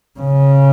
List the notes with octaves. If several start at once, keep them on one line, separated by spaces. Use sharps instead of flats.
C#3